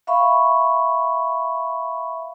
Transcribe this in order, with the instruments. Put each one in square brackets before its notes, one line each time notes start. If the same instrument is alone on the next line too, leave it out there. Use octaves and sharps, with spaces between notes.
[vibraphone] E5 F5 B5 C#6